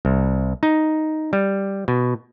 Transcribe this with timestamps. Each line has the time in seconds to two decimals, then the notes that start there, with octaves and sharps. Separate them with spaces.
0.05 C2
0.63 D#4
1.33 G3
1.88 B2